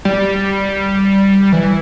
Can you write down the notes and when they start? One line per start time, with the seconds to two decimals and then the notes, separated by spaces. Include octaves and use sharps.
0.05 G3
1.52 E3